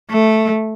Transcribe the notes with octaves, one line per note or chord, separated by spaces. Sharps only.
A3